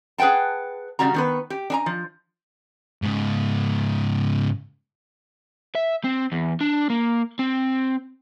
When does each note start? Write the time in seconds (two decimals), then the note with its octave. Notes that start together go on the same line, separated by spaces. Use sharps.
0.18 G#4 B4 F#5 G5 A5
0.99 C#3 G3 C#4 F#4 A#5
1.14 D#3 B3 B4
1.50 G4
1.70 D4 G#5 A#5
1.86 F3
3.03 G#2 C#3
5.75 E5
6.04 C4
6.32 E2
6.61 D4
6.90 A#3
7.39 C4